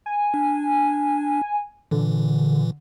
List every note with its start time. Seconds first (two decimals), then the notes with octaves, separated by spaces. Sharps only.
0.06 G#5
0.34 D4
1.91 A#2 D3 E3